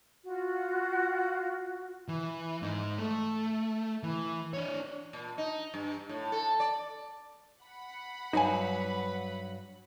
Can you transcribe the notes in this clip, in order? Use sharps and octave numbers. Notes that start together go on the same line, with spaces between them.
F4 F#4
E3
G#2 D#4
A3
E3
D4 C#5
A#2
D#4
G2
A2
A4
D5
F#5 B5
G2 F#3 D#4 B4 G#5